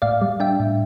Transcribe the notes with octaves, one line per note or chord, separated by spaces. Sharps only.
A2 D5 F5
G3
D4 E5 G5
A2